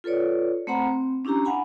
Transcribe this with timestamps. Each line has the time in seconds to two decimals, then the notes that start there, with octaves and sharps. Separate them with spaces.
0.04 F4 A4 B4 C#5 D5
0.67 A3 C4 C5 F#5 A#5 B5
0.86 C4
1.25 C#4 D4 E4 G4 A#5
1.45 F5 F#5 G#5 B5